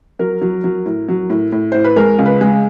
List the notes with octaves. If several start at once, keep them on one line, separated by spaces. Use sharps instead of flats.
F#3 A#4
F#3
F#3
A2
F#3
A2
A2
A2 C5
B4
G#3 A#4
C#2
B4
G#3